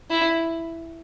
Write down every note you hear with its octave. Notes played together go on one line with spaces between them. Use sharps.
E4